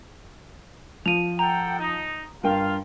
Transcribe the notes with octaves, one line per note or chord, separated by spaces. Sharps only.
F3 D#7 F7
A4 F#5 G5 A#5
D#4
G2 F4 A#4 F5 G5